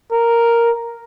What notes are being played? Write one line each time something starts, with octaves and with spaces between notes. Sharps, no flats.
A#4